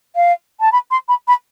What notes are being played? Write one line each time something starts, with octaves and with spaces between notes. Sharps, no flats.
F5
A5
B5
C6
B5
B5